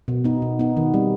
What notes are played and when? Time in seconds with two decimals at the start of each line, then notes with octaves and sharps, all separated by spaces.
0.08 B2
0.24 B3 D#4
0.42 B2
0.59 B3 D#4
0.77 D#3
0.94 G3 C4